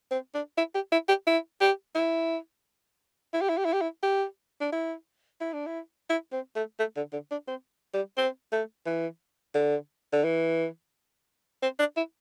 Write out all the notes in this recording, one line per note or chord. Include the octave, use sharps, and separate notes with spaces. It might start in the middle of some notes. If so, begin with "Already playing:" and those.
C4
D4
E4
G4
E4
G4
E4
G4
E4
E4
G4
E4
G4
E4
G4
E4
G4
D4
E4
E4
D4
E4
E4
C4
A3
A3
D3
D3
D4
C4
G3
C4
A3
E3
D3
D3
E3
C4
D4
E4